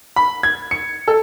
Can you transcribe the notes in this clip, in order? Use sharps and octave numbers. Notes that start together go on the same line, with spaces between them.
B5
G#6
C#7
A4